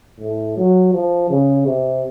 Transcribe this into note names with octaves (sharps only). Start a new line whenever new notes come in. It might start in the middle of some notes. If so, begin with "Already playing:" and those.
A2
F#3
F3
C#3
C3